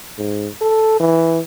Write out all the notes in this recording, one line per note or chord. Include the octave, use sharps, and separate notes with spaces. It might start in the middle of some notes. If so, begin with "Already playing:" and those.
G#2
A4
E3